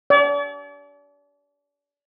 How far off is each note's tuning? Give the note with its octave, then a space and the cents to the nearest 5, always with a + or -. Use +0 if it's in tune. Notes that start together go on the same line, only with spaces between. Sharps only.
D5 -40